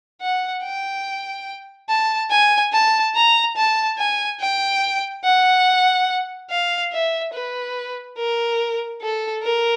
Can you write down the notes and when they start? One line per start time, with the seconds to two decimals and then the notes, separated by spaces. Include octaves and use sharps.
0.21 F#5
0.64 G5
1.89 A5
2.31 G#5
2.72 A5
3.15 A#5
3.56 A5
3.98 G#5
4.40 G5
5.24 F#5
6.50 F5
6.92 E5
7.33 B4
8.18 A#4
9.01 A4
9.43 A#4